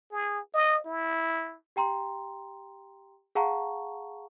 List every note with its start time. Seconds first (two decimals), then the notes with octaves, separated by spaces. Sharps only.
0.12 G#4
0.54 D#5
0.86 E4
1.76 G4 G5 A#5 C6
3.35 G#4 F5 F#5 A5 A#5 C#6